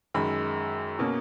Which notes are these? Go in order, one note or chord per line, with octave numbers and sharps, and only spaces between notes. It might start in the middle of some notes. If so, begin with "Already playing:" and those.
F#2 D#3 G#3 B5
B2 A#3 C#4